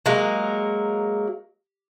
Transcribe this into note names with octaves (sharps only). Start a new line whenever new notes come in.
F#3 G#3 A#3